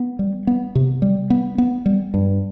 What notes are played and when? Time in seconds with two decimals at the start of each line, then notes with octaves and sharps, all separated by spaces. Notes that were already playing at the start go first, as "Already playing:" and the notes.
Already playing: B3
0.19 G3
0.47 B3
0.75 C3
1.02 G3
1.30 B3
1.58 B3
1.86 G3
2.14 G2